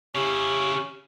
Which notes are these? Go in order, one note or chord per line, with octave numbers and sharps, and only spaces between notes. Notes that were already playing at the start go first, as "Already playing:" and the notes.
C#3 C#4 E4 G4